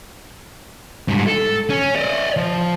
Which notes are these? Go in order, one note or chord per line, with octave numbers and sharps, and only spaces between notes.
G#2 G3
A4
C#4
D5 D#5
F3